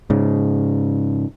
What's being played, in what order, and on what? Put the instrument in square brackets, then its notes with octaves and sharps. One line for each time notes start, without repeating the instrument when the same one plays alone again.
[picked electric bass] G#2 C#3